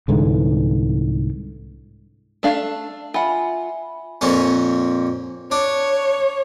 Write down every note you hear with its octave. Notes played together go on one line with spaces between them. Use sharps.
C2 G#2 D3 E3
A3 D4 F5
F4 E5 F#5 G#5 B5
F2 A#2 C#4
D4 C#5